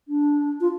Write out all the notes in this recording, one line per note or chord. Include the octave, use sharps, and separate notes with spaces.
D4
F4